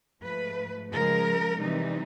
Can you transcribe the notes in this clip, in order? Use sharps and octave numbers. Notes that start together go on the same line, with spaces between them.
G#2 F3 A3 B4
C#3 F3 G#3 A#4
C3 E3 G3 C4 D#4